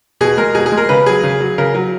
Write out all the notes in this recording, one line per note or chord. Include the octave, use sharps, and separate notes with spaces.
B2 G#4
G#3 A#4
B2 G#4
G#4
G#3
A#4
C#3 B4
F#3 G#4
C#3
F#3
C#3 A#4
F#3